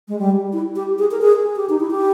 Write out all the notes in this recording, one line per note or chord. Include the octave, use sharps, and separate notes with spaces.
G#3
G3
E4
G4
G#4
A#4
G#4
G4
D#4
E4
G4